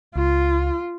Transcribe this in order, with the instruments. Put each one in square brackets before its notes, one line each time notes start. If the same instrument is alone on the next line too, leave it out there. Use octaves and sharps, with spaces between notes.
[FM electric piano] C#2 [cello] F4